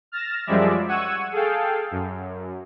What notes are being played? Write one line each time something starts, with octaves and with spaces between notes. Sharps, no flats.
F6 A6 A#6 E7
F#2 F3 G3 G#3 D5 E5
F#5 C#6 E6 G#6 D#7
G#4 A4 F5 G5
F#2